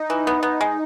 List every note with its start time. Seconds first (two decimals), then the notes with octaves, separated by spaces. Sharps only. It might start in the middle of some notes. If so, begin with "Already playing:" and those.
Already playing: D#4
0.10 E3
0.27 B3
0.43 B3
0.61 G#3